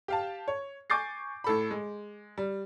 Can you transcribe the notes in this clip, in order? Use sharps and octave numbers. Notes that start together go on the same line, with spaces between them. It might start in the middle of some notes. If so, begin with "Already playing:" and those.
G4 F5 A5
C#5
G#5 C#6 D6 G6 A6 C7
A2 A4 B5
G#3
G3